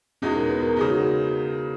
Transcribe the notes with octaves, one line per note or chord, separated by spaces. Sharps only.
E2 B2 G#3 C#4 D#4 F#4
A#4
B4
A#4
C#3 G#3 D#4 G#4
F#4